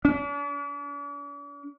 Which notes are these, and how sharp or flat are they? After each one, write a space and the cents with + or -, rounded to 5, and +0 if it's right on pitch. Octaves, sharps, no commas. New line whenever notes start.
D4 -45